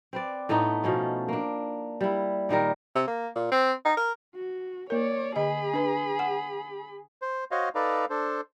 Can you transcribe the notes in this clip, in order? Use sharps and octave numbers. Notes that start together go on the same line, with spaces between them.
C4 B4 D5
A2 A3 B3 D#4
B2 F3 C#4 A4
A#3 D4
G3 E4
A#2 D#3 G3 A#4
C3
A#3
A#2
C4
D#4
A#4
F#4
A#3 A#4 C#5 D5
D3 G#4 D#5 B5
D4 B4
F#5
C5
F#4 C5 C#5 D#5 F5
D#4 A4 B4 D5 F5 A#5
D4 A4 C5